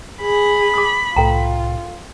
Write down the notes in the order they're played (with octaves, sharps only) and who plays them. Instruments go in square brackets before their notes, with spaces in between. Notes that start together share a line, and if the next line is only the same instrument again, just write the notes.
[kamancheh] G#4 [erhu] B5
[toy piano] D6 D#6
[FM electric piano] C2 A2 [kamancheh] F4 [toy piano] A4 G5 A#5